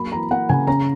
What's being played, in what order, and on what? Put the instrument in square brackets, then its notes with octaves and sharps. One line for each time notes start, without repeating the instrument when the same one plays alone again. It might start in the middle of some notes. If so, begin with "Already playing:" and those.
Already playing: [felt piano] F#3 A#3 B5
E3 A#5
A#3 F#5
C#3 G#5
C#4 A#5